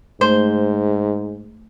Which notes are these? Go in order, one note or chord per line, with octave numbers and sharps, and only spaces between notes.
G#2 A3 C5